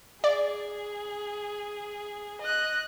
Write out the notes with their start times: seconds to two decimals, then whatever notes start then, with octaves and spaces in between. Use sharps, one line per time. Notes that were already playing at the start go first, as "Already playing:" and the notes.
0.24 G#4 D5
2.41 D#5 F#6